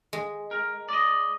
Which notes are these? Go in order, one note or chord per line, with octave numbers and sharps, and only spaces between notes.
G#3
A#4
D5 D#5